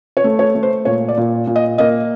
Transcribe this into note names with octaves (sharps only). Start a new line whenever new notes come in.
C#5
A3
C#5
A3
C5
A#2 C#5
D5
A#2
A#2
D#5
A#3 D#5